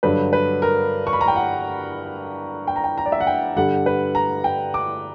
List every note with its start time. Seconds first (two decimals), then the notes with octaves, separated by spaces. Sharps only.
0.03 G2 D3 F#3 B4
0.33 B4
0.62 A#4
1.07 C#6
1.13 B5
1.21 A#5
1.28 G5
1.36 F#5
2.68 G5
2.76 A#5
2.84 G5
2.98 A#5
3.06 D5
3.12 E5
3.20 F#5
3.27 G5
3.56 G2 D3 G3 F#5
3.86 B4
4.15 A#5
4.44 G5
4.74 D6